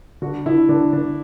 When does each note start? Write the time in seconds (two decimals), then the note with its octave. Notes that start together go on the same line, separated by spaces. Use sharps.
0.22 D3 F#4
0.46 D3 E4
0.69 D3 D4
0.93 D3 D4